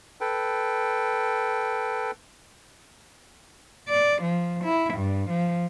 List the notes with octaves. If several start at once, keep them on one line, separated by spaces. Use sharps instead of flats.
A4 B4 G5
D5
F3
E4
G2
F3